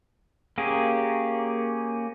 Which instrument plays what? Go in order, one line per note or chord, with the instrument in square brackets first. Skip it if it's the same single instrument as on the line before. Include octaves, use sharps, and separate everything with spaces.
[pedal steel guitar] A#3 C#4 G4 G#4